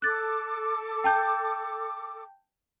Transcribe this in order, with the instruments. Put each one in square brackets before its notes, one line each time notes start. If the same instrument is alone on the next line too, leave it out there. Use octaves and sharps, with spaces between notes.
[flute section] A4 D6 [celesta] F#6 A6
[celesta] G5 A5 G6